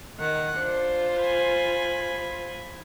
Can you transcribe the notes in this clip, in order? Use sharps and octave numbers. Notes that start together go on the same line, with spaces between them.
D#3 F#5
D4 F4 C5
G#5 B5